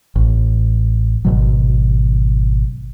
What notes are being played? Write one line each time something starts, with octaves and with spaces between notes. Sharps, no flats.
A1
G#1 B2 F#3